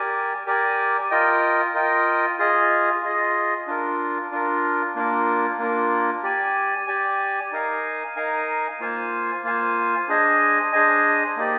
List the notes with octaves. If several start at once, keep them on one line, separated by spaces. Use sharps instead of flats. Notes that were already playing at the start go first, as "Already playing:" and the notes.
Already playing: G4 A#4 D5 G#5
G4 A#4 D5 G#5
F4 A#4 D#5 G5
F4 A#4 D#5 G5
F4 G#4 D#5
F4 G#4 D#5
D4 F4 A#4
D4 F4 A#4
A#3 D4 F4 A#4
A#3 D4 F4 A#4
G4 D5 G#5
G4 D5 G#5
D#4 A#4 F5 G#5
D#4 A#4 F5 G#5
A#3 F4 C5 F5 G#5
A#3 F4 C5 F5 G#5
D4 G#4 C5 D#5 G#5
D4 G#4 C5 D#5 G#5
A#3 D#4 G4 D5